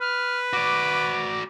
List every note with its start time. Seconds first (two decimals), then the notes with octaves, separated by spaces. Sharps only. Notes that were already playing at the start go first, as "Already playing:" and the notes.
0.01 B4 F6
0.53 F#4 D5 D6